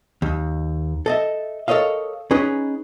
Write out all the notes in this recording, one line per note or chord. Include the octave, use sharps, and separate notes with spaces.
D#2
A4 D#5 E5
A4 A#4 C#5 D#5 F5
C#4 D#4 G#4 B4